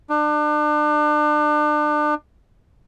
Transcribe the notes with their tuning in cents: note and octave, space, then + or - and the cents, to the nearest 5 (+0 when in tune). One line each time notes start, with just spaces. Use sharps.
D4 +35